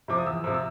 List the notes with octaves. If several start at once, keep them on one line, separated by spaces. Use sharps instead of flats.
C3 F3 D6
D#6
E2 E6
C3 F3
E6